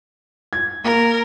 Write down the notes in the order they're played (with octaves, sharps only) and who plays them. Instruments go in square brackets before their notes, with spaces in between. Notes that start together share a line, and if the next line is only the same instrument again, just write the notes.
[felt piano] G#6
[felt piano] A#3 [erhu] A#4